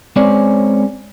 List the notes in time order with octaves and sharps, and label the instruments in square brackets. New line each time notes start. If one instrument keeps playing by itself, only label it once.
[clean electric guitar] G#3 C4 C#4 C#5 D5